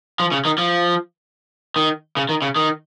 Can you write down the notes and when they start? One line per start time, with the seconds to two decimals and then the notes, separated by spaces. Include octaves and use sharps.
0.20 F3
0.32 C#3
0.45 D#3
0.58 F3
1.76 D#3
2.17 C#3
2.29 D#3
2.42 C#3
2.56 D#3